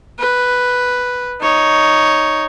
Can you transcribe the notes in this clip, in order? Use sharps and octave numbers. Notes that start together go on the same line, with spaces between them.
B4
D#4 C#5